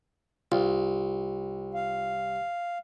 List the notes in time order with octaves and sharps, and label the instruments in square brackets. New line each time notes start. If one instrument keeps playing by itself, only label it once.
[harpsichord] C2 [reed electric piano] F4
[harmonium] F5